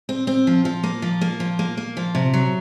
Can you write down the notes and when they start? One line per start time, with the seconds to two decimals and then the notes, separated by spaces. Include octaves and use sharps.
0.09 C4
0.27 C4
0.47 F3
0.65 F3
0.83 A#3
1.02 F3
1.21 A#3
1.40 F3
1.59 A#3
1.77 A#3
1.97 F3
2.15 C3
2.34 F#3